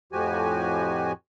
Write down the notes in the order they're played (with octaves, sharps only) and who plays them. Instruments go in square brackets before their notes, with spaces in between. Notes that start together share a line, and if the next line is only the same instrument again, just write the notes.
[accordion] F2 A2 F3 F#4 G4 G#5